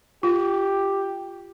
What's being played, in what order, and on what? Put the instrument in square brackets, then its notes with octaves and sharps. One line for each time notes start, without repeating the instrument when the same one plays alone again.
[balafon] F4 [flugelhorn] G4